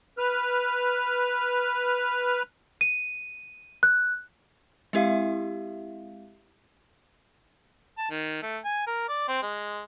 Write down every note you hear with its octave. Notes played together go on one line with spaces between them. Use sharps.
B4 F6
D#7
F#6
G#3 C4 E4 G4 E5 F5
A5
D#3
A3
G#5
A#4
D5
C4
G#3